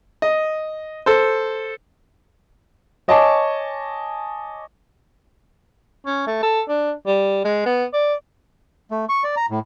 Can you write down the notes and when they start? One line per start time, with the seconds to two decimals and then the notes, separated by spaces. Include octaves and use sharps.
0.22 D#5
1.06 A4 C5
3.08 C#5 D#5 G#5 A5 C#6 D6
6.06 C#4
6.27 A3
6.43 A4
6.69 D4
7.06 G3
7.45 G#3
7.66 B3
7.93 D5
8.91 A3
9.09 C#6
9.24 D5
9.37 A#5
9.50 A2